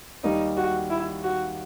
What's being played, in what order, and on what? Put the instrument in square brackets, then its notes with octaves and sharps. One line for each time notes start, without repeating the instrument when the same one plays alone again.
[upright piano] D#2 D#3 G3 [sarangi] D#4
[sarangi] F#4
E4
F#4